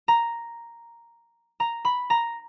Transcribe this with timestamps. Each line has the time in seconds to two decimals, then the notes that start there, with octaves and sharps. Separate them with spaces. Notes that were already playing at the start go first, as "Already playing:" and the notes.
0.08 A#5
1.60 A#5
1.85 B5
2.10 A#5